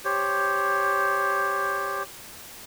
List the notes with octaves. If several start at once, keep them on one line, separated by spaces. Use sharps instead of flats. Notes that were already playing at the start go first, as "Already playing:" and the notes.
G4 C5 C#5